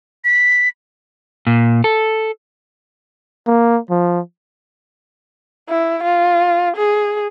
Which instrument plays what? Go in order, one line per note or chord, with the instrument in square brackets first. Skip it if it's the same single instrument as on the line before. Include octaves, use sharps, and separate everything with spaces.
[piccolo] B6
[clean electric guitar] A#2
A4
[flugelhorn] A#3
F3
[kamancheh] E4
F4
G#4